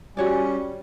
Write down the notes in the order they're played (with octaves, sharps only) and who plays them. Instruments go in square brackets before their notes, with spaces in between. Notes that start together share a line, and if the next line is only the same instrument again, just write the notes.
[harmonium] G3 C#4 [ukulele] F#4 C#5 D5